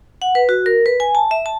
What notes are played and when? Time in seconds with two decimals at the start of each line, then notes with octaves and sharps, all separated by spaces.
0.22 F#5
0.35 B4
0.49 F#4
0.66 A#4
0.86 B4
1.00 G#5
1.15 A5
1.31 E5
1.46 A5